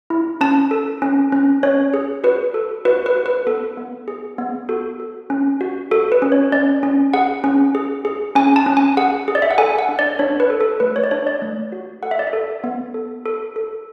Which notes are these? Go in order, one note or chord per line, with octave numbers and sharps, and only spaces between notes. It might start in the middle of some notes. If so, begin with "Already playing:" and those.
E4
C#4 A5
A4
C#4
C#4
C#4 C#5
G#4
F#4 B4
A4
F#4 B4
B4
F#4
B4
B3 A4
B3
G#4
B3
F#4 A4
A4
C#4
F#4
F#4 A4
B4
C#4
C#5
C#4 D5
C#4
G#4 F#5
C#4
G#4
G#4
C#4 G#5
A5
C#4
G#5
G#4 F#5
G#4
D5
E5
F#5
A4 G#5
F#5
D4
D5
D4 C#5
B4
A4
A4
A3 B4
C#5
D5
D4 C#5
D5
A3
F#4
A4 F#5
E5
D5
E5
A4
B3
A4
A4
A4